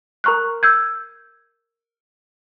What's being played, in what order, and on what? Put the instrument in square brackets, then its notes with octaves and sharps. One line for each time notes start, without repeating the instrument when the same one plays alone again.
[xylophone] A#4 A#5 C#6 F6 F#6
E6 G6 G#6